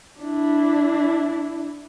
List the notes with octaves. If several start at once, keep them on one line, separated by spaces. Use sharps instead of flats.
D4 E4